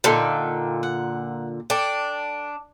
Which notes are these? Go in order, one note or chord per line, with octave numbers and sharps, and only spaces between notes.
A#2 D3 D#4 A4 G5
F#5
D4 A4 G5 D6